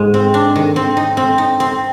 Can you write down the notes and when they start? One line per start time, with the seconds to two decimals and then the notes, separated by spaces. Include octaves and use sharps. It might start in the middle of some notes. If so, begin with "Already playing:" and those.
Already playing: G#2 G#3
0.14 C4
0.34 D4
0.56 D#3
0.76 C4
0.97 D#4
1.17 C4
1.38 D#4
1.60 C4